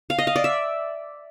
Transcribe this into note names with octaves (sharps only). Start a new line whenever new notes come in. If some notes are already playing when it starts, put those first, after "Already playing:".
F5
D#5
F5
D5
E5